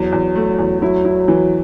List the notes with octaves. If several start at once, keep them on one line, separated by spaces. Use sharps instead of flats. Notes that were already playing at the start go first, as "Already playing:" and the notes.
Already playing: E2 F#3
E2
A3
E2
F#3 E4
E4
E3